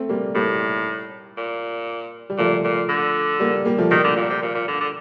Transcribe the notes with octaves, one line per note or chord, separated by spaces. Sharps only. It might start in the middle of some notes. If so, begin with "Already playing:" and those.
Already playing: A3 C4
G3 A#3
A2 G3 A#3
A#2
G3
A#2 F3 A3
A#2
D3
G3 A#3
G3 A#3
F3 A3
D#3 G3 A#3
D3
A#2
C3
A#2
A#2
D3
D3